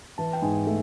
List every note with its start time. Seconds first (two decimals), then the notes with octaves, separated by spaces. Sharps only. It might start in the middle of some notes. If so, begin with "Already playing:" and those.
0.18 E3 A5
0.33 G5
0.42 G#2 G#5
0.67 A3